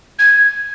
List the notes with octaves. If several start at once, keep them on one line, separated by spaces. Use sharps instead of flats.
G#6